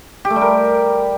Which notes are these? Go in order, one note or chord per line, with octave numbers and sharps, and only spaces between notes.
G4
A3
G3
A#4